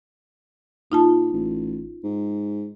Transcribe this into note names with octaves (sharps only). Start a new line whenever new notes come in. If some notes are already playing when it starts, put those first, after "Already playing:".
A#2 D#4 F4 A5
A1
G#2